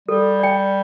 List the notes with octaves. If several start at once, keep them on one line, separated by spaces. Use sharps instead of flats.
G3 A4
D5 G5